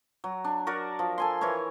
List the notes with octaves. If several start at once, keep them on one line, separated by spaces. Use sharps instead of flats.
F#3
D4
F#4 A#4 D5
F3
A4 G#5 C6
E3 E4 A#4 C#5